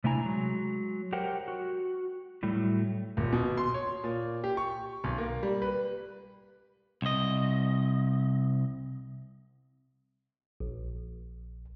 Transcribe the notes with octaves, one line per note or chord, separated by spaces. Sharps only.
C3 A3 D4 E4 G#5 A#5
F#3 G#3
G4 A#4 C5 C#5 F#5 G5
F#4
A2 F#3 G3 A3 E4
D#1
B2
C6
C#5
A#2
G4
C#6
B1
A#3
G3
B4
C2 D#5
A#1